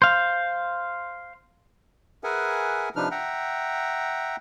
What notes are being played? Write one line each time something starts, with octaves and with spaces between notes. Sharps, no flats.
C5 F5
G#4 A#4 B4 E5 F#5 G#5
C3 F3 D4 D#4 B4 F6
E5 F#5 G5 A#5